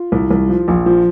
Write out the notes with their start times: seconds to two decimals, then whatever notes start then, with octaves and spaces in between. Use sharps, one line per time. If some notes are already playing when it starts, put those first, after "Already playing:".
Already playing: F4
0.12 C2
0.31 C2
0.49 F3
0.68 A#1
0.86 F3